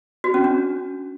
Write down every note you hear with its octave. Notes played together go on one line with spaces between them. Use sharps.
F#4
C#4
D4